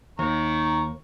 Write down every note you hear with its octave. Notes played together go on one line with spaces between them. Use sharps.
D#2 D#3 A#5 C#6